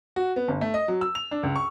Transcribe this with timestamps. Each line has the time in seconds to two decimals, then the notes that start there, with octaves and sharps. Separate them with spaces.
0.16 F#4
0.36 B3
0.48 G1
0.61 A3
0.74 D#5
0.88 F#3
1.01 E6
1.15 F7
1.31 D4
1.43 C#2
1.56 C#6